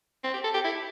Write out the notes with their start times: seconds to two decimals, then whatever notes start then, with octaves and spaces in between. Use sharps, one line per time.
0.24 C4
0.34 G4
0.44 A4
0.54 G4
0.64 E4